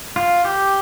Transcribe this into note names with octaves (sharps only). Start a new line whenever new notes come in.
F4
G4